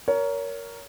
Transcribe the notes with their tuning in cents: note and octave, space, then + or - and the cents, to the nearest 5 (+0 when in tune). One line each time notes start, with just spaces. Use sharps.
A#4 +0 C#5 +25